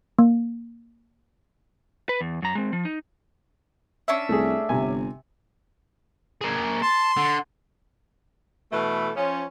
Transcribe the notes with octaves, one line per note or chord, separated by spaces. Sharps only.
A#3
B4
E2
F#2 A#5
G#3 C4
F3
D#4
C#4 D4 E5
C2 A3 G#4
G1 C3 G#5
A#3 G#4
A5 C6
D3
B2 E3 A3
F3 C#4